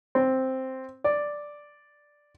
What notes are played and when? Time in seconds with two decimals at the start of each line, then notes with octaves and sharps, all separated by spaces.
0.15 C4
1.04 D5